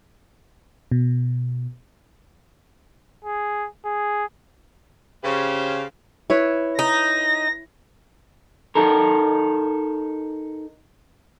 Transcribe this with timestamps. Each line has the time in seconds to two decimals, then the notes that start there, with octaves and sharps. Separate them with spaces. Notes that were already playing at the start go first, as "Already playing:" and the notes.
0.91 B2
3.25 G#4
3.85 G#4
5.24 C#3 G4 C5 F5
6.30 E4 B4 C#5
6.79 D#4 A#6
8.75 D#4 A4 A#4